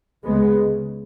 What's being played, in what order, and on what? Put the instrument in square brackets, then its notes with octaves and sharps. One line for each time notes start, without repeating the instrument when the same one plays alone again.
[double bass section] C#2 C#3 G#3 B3